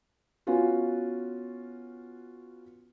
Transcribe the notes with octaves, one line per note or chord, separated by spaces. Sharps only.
B3 C#4 F4 F#4